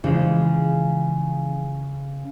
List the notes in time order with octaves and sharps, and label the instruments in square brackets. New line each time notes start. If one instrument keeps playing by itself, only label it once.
[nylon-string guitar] C#3 [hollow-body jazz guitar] E3 F3 G#3